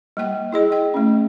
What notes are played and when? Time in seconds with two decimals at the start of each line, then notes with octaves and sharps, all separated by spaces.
0.17 G3 A#3 G5
0.52 E4 G#4 D#5
0.72 G5
0.94 A3 C#4